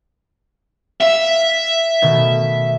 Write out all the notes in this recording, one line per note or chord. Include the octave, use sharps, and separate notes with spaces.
E5 F5
B2 D#3 A3